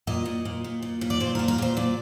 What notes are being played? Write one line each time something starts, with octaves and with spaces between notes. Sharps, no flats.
A#2 D#5
A#2
A#2
A#2
A#2
A#2
D5
A#2 C5
A#2 A#4
A#4
A#2 C5
A#2 D5